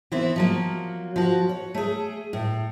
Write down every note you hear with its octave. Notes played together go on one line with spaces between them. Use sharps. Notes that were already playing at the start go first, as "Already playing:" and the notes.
E3 B3 C4 E4
F3 F#3 A#3
F3 F#4
C#5
A3 G#4
A2